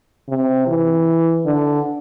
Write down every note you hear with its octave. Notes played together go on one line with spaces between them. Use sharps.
C3
E3
D3